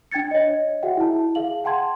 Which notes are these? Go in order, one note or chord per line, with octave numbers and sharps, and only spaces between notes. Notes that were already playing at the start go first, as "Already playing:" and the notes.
D4 G5 G#6 A6 C#7
C#5 D#5
F#4 G#4 E5 F#5 G5
E4 A5
G#4 E5 F5 F#7
F#5 G5 A5 C6 G#6